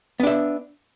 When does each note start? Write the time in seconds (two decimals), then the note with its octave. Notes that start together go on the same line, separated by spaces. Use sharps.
0.20 B3
0.23 D4
0.27 E5